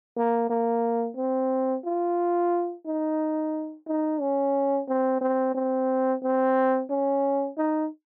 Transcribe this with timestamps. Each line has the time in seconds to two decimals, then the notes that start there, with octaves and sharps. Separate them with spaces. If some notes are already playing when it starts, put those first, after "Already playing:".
0.17 A#3
0.50 A#3
1.17 C4
1.84 F4
2.86 D#4
3.87 D#4
4.20 C#4
4.88 C4
5.21 C4
5.54 C4
6.23 C4
6.90 C#4
7.57 D#4